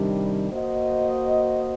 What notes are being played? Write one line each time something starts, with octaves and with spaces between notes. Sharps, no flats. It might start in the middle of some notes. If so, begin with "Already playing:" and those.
Already playing: C3 D#3 G3 D4
A#3 F#4 C5 D#5